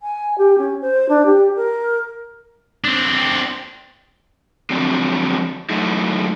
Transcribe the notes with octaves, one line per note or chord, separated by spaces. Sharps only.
G#5
G4
C#4
C5
D4
G4
A#4
C4 D4
D3 F3 F#3 C4 D4
F#3 A3 D#4 E4